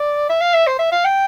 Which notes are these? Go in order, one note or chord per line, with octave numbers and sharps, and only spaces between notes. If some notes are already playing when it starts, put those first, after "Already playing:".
Already playing: D5
E5
F5
E5
C5
E5
F5
G5